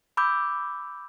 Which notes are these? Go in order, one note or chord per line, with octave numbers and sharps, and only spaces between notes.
B5 D6 E6 G6